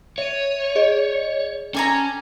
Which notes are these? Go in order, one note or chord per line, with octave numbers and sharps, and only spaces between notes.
C#5 E5 D#7
G#4 D5 D#5
C#4 A4 G5 G#5 A#5 D6 G#6